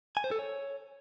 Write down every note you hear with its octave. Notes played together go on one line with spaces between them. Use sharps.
G#5
C5
A4
C#5